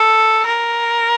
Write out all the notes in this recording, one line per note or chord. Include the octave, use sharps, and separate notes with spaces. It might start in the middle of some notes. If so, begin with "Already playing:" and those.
Already playing: A4
A#4